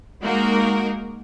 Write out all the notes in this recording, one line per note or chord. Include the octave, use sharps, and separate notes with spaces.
G#3 A#3 D#4 F#4 A#4